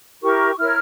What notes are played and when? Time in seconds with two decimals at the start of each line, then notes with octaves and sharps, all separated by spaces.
0.22 E4 G4 A#4 C#6
0.58 E4 A#4 C#5 F6